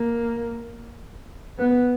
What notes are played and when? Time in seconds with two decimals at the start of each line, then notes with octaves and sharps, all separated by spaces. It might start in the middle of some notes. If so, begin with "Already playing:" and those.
Already playing: A#3
1.58 B3